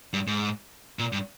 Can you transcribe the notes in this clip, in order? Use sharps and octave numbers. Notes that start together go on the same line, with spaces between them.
G2
G#2
A#2
G2